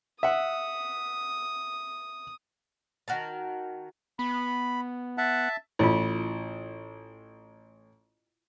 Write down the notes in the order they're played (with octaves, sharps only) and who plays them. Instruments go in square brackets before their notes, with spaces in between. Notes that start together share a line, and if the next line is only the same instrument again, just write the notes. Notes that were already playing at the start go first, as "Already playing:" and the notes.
[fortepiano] E5 F#5 [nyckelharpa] D#6
[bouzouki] D#3 F#4 A#4 A5
[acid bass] B3 [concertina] B5
[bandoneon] E5 A5 [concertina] F#5
[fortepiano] A1 [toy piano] E4 F4